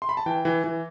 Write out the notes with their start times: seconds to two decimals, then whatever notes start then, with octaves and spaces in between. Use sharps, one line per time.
0.02 C6
0.09 B5
0.17 A5
0.26 E3 G5
0.45 E3
0.64 E3